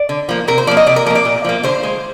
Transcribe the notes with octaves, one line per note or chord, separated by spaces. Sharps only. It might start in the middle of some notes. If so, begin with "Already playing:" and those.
Already playing: D5
D3
F3 A#3
C3 A#4
C5
F3 A#3 D5
D#5
C3 D5
A#4
F3 A#3 A#4 D5
A#2
F3 A#3
D3 C5
G#3